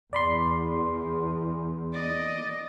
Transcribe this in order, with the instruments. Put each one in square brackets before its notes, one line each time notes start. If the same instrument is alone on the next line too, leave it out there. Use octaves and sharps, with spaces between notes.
[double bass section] E2 [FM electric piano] D5 B5 C6
[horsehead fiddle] D5 D#5